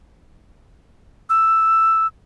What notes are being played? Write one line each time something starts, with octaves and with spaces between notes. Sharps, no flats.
E6